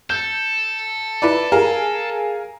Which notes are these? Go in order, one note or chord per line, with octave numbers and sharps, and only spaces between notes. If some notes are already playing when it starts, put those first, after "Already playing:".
A4 G6
E4 B4 D5
G#4 A#4 F5